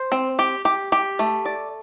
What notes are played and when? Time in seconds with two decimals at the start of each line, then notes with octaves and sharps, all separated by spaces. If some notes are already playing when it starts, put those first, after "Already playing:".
Already playing: C5
0.12 C4
0.39 G4
0.65 G4
0.92 G4
1.19 A3
1.45 D5